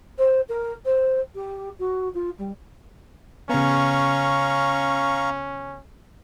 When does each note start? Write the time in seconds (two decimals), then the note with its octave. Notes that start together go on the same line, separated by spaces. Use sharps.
0.19 C5
0.49 A#4
0.85 C5
1.35 G4
1.79 F#4
2.14 F4
2.38 G3
3.50 C#3 B3 C#4 F5 A#5 C#6